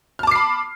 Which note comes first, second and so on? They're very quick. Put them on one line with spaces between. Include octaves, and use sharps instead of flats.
F6 A5 D6 C7 B5